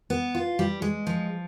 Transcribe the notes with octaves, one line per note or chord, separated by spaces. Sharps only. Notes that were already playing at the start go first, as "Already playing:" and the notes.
B3
F4
G3
G#3
F3